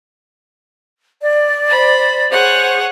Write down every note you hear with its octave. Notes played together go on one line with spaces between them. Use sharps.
D5
C5 B5
G#4 C5 C#5 F#5